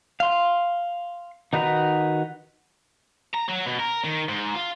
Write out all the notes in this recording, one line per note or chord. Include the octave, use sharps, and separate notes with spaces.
F5 C6
D#3 D#4 F#4 B4 A#5
A#5
F#3
B2
A#4
D#3
G#2
F4